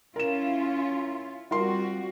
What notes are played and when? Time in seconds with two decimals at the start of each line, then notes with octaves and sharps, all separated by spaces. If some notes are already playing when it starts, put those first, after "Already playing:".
0.16 C#4 E4 F4 A#4 E7
1.51 G3 C4 F4 F#4 A#4 C6